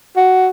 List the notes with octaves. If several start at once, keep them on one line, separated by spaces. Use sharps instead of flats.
F#4